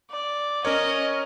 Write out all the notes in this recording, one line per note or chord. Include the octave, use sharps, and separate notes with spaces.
D5
C#4 A#4 C#5 D#5